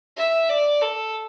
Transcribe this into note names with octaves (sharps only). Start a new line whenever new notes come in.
E5
D5
A4